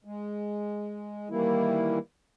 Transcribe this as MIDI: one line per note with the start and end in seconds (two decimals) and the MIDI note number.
0.05 1.29 56
1.30 1.99 51
1.30 1.99 52
1.30 1.99 55
1.30 1.99 58
1.30 1.99 64